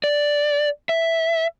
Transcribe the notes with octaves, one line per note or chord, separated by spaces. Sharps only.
D5
E5